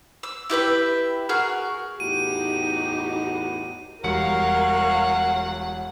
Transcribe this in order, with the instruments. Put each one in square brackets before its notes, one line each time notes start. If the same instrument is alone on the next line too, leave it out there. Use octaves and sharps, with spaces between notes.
[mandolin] E6
E4 G4 B4 E5
F#4 G#4 A#4 F6
[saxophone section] E2 A2 F#4 [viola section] D#4 G4 [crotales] D#7
[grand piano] E1 G3 C#7 [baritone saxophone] F#3 [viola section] A#4 F5 [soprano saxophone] F#5